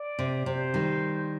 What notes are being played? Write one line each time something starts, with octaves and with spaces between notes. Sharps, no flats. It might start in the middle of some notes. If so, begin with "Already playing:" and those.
Already playing: D5
C3
C3 C5
D#3 G3